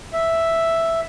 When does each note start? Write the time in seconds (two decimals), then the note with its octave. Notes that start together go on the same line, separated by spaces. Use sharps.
0.13 E5